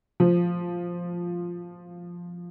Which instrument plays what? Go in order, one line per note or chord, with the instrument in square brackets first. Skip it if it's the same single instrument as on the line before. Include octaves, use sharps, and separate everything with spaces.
[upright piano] F3